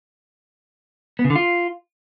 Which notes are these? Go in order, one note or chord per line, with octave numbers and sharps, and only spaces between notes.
B3
C#3
D3
F4